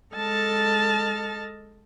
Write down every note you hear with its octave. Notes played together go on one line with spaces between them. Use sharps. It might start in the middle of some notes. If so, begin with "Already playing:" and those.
G#3 A4 D#5 A5 F6 A6